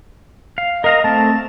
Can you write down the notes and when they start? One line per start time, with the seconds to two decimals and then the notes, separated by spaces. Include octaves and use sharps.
0.58 F5
0.84 A#4 D#5 F5 A#5
1.04 A3 C4 A5